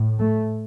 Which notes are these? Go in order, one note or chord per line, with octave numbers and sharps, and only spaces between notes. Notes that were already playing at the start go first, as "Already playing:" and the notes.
Already playing: A2
A3